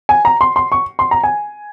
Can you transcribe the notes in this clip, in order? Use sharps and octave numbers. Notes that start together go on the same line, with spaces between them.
G#5
A#5
C6
C6
C#6
C6
A#5
G#5